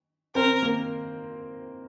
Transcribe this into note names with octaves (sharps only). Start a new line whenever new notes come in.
C4 A#4 C5
A#3 A#4